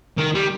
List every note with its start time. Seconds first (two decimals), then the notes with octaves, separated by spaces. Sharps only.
0.18 D#3
0.35 G3